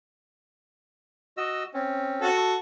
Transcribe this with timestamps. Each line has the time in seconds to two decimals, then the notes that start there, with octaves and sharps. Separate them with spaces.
1.37 F#4 D#5 E6
1.74 C4 C#4
2.21 F#4 A4